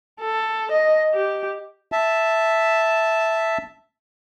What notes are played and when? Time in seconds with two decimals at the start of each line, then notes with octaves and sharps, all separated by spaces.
0.21 A4
0.71 D#5
1.14 G4
1.92 E5 A5